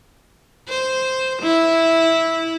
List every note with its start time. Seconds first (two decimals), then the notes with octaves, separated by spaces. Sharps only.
0.69 C5
1.42 E4